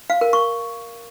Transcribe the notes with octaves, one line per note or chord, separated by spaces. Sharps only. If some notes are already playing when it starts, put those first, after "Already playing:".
F5
A#4
C#6